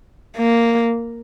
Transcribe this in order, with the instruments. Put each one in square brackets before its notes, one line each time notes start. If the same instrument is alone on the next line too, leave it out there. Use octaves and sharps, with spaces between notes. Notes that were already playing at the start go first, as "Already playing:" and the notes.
[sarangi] A#3